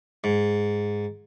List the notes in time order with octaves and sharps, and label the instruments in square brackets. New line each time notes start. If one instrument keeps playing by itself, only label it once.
[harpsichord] G#2